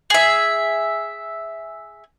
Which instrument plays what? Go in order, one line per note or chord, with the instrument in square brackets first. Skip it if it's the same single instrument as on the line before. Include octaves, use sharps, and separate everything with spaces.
[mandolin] G#4 E5